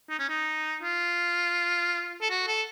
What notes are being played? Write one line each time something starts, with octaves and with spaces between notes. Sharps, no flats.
D#4
C#4
D#4
F4
A4
F#4
A4